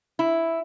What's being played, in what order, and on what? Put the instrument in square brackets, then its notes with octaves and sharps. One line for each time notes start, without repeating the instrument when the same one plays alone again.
[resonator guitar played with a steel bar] E4